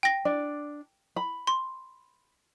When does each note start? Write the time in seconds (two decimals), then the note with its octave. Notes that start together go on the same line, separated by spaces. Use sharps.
0.03 G5 A#6
0.25 D4 D5
1.16 B5
1.47 C6